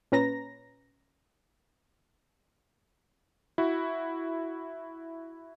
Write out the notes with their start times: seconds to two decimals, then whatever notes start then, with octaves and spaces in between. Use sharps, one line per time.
0.12 A#2 C#4 B4 A#5 A#6
3.58 E4 F#4